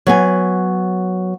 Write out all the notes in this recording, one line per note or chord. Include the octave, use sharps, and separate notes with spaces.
F#3 B3 G#5